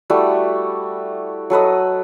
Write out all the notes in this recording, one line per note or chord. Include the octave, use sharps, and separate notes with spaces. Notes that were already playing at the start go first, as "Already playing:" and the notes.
G3 A3 E4 F#4
F#3 A4 B4 D#5